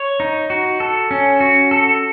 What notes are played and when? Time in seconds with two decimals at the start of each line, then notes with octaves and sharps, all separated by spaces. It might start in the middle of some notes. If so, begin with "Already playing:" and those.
Already playing: C#5
0.20 D#4
0.50 F#4
0.80 A4
1.11 C#4
1.40 F#4
1.71 A4